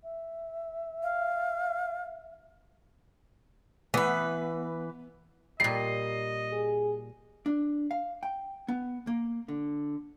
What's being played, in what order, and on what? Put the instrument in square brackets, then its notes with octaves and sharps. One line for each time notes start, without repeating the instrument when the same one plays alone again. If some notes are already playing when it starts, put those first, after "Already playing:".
[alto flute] E5
[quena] F5
[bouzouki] E3 B4 [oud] B3
[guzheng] A#2 G3 [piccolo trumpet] D#5 [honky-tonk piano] C7
[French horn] G#4
[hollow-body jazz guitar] D4
F5
G5
B3
A#3
D3